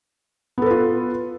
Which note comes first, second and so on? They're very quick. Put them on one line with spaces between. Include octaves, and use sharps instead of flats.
B3 A4 B4 F4